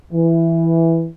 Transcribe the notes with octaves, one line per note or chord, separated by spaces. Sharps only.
E3